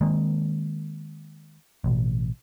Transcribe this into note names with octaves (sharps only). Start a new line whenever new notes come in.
D#3 G#3 A#3 C4
A1 B2